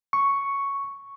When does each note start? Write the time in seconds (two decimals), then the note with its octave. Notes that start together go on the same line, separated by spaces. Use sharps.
0.13 C#6